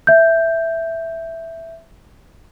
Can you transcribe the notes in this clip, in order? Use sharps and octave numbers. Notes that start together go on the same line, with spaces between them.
E5 G6